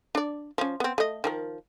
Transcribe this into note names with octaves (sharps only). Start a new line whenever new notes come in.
D4 D5
F3 C#4
B3 C4
A3 D#5
D#3 F3 A#4